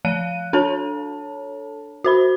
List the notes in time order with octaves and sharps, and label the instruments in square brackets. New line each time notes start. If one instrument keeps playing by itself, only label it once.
[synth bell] F3 F5 F#6 D#7
D4 A4 C#5 A5
F#4 C5 B5